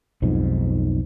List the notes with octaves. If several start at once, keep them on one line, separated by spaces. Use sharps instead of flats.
B1 F2 G#2